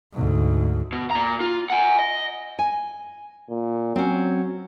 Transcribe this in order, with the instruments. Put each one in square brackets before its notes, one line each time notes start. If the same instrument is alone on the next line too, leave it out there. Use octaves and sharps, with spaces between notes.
[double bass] D2 G#2
[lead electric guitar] B2
A#2 A#5
F4
F#5 G#5
D#5
[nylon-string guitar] G#5
[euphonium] A#2
[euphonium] F#3 [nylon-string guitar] C4 C#4